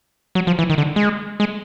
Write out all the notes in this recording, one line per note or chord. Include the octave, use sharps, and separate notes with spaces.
F#3
F3
E3
D#3
D3
G#3
G#3